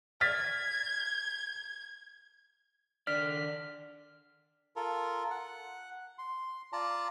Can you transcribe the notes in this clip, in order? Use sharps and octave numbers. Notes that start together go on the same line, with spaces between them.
F6 G#6 A6 B6
D#3 D4 D5 F6 B6
F4 A4 A#4
F#5
C6
F4 D5 A5 A#5